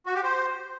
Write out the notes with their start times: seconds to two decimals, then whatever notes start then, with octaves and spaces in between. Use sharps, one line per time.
0.06 F#4
0.15 G4
0.23 C5